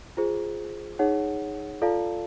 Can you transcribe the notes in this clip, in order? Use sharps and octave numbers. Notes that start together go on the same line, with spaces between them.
F4 G#4 C5
D#4 G#4 C#5 F#5
F4 A4 D5 F5 A5